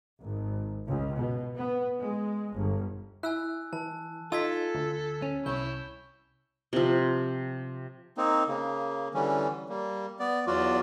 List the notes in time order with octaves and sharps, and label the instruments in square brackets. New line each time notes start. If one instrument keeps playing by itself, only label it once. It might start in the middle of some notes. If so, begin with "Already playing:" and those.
[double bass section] G#1
C#2
B2
B3
G#3
G1
[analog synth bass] E4 [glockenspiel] G#5 E6 F#6
[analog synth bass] E3 [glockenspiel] A5
[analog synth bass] D#4 [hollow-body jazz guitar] F4 [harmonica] A4 [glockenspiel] E6 G#6 B6
[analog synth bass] D2
[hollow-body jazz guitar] C#4
[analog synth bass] C2 [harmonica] E4 C#5 [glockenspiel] G6 G7
[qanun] C3 F3
[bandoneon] A#3 C4 D#4
C#3 A#3
D3 E3 G3 C#4
G3 A#3
B3 D5
E2 F#3 F4 F#4 D5